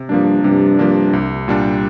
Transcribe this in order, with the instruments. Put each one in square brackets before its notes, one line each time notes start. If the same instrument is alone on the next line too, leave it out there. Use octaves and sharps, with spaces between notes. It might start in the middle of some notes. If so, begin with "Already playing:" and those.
Already playing: [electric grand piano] C3
[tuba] G2 [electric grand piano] F3 A#3 D4
[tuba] G2 [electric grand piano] C3
[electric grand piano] F3 A#3 D4
C2
A#2 G3 D4